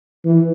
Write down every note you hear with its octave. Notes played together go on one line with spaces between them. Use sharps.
E3